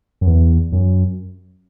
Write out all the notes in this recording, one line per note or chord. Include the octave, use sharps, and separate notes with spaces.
F#2
E2
F#2